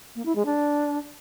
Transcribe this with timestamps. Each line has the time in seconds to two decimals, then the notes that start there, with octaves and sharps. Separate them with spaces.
0.16 A#3
0.26 E4
0.36 G#3
0.46 D4